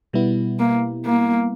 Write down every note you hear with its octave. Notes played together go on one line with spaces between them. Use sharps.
B2 G3 B3 E4
A#3
A#3